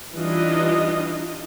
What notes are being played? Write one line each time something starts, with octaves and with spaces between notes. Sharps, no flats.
E3 G3 D4 D#4 F4 D#5